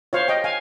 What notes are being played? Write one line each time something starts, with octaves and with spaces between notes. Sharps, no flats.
F4 C5 C#5 F5
D#5 G5
F5 G#5